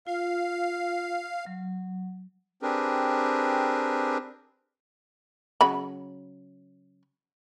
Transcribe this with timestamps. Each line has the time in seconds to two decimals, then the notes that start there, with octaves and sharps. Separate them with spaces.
0.07 F4 F5
1.46 F#3
2.62 C4 D4 G4 G#4 A#4 B4
5.61 C#3 F#3 B5